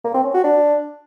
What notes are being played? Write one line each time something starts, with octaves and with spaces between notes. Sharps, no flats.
A#3
C4
C#4
F#4
D4